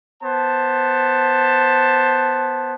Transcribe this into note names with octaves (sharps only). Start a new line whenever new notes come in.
B3 C5 A5